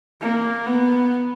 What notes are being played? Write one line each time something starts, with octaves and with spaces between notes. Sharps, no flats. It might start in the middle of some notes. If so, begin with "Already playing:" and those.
A#3
B3